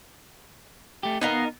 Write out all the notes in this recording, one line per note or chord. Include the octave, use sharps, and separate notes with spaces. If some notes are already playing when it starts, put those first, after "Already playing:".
A3 G4
B3 D#4 A#4 D#5 F5